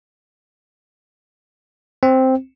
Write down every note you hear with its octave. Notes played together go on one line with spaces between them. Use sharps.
C4